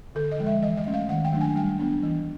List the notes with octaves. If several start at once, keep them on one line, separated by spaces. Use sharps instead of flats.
D3 A4
D#5
F3 G#3
E5
E3 D#5
D#5
A3 C#4
F5
D#3 F#5
G5
F#3 A3 D4
G#5
G3 G5
B3 D4
E3